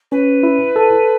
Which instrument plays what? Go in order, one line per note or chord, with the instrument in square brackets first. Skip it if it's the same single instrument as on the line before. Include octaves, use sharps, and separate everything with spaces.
[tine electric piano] C#4 [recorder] B4
[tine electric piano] E4
A4